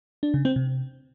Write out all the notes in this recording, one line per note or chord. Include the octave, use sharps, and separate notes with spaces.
D4
C#3
C4
C3